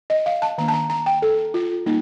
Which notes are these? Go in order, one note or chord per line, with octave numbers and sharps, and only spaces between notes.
D#5
F5
A5
D#3 A#3 D4 A#5
A5
A#5
A#5
G5
A4
F4
G3 A#3 D#4